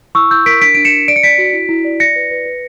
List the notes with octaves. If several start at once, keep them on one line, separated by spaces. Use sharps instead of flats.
E4 C#6 E6
E4 E6 G6
A#4 B6 D7
D4 B6 D7
D4 D7
C#7 E7
D4
D5 D7
C#7
D5 B6 D7
F#4
E4
E4
D5
D5 A#6 C#7
B4
B4
B4